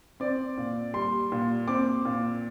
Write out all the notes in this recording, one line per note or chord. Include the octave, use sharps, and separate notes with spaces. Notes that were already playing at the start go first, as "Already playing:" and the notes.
C4 D5
A#2
G3 C6
A#2
C4 D6
A#2